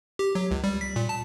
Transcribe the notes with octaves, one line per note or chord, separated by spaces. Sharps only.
G4
F#3
C#2
G3
B6
A#2
A5